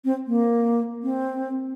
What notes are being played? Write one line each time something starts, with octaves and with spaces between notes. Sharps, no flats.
C4
A#3
C4